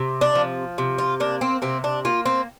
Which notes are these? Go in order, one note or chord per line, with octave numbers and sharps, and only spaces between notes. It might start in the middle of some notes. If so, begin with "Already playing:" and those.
Already playing: C3
D4
F3
C3
F4
A#3 D4
C4
C3 C4
D4
A#3 F4
C4